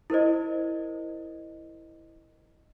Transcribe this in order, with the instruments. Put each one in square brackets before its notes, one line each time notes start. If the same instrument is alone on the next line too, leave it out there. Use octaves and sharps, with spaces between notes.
[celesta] E4 A#4 C5 D#5